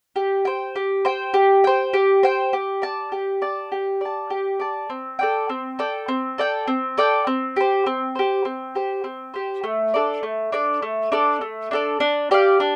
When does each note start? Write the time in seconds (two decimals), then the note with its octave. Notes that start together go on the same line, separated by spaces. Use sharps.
0.16 G4
0.45 C5 G5
0.76 G4
1.05 C5 G5
1.34 G4
1.64 C5 G5
1.93 G4
2.23 C5 G5
2.53 G4
2.82 D5 A5
3.12 G4
3.42 D5 A5
3.72 G4
4.01 D5 A5
4.30 G4
4.60 D5 A5
4.90 C4
5.19 A4 D5 G5
5.50 C4
5.79 A4 D5 G5
6.08 C4
6.38 A4 D5 G5
6.68 C4
6.98 A4 D5 G5
7.27 C4
7.56 G4 C5
7.86 C4
8.15 G4 C5
8.45 C4
8.75 G4 C5
9.04 C4
9.34 G4 C5
9.64 A3
9.94 D4 A4 D5
10.23 A3
10.52 D4 A4 D5
10.82 A3
11.12 D4 A4 D5
11.41 A3
11.71 D4 A4 D5
12.00 D4
12.31 G4 D5 F5
12.60 D4